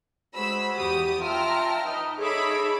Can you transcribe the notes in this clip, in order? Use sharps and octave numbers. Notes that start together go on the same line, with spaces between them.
G#3 F#4 C5 B5 E6
E2 G4 D#6 A6
F4 E5 G5 A5 A#5 F6
D#4 B4 D#5
D#4 G#4 A4 C#5 E5 B5 D6